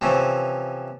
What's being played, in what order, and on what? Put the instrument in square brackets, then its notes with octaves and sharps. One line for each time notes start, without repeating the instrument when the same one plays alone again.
[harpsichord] C3 E3 F3 C#4